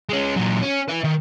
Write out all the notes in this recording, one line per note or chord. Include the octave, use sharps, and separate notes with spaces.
G#3 C#4
A#2 F#3
C#4
B4 E5
D#3